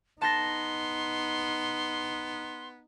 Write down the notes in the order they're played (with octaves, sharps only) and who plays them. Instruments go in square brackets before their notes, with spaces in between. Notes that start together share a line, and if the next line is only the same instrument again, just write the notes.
[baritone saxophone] B3 [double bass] D#4 [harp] A5 A6 A#6 [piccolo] C6